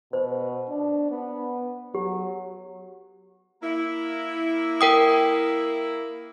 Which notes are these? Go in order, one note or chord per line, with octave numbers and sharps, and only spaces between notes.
B2 C5
D4
B3
F#3 G4
A#3 E4
A#4 G5 D#6